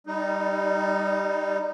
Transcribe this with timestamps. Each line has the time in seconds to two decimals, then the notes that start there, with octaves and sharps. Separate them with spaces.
0.07 G3 D#4